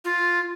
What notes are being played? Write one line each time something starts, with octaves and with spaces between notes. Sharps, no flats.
F4